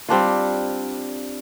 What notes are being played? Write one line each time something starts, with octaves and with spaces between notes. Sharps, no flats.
G3 C4 D4 F4